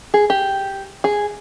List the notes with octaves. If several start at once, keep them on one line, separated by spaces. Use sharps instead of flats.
G#4
G4
G#4